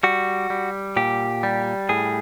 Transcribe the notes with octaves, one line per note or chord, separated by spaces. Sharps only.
G3 F#4
G3
A#2 G4
G3
A2 G#4